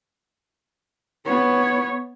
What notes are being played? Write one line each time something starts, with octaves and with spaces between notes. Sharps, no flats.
B3 C#5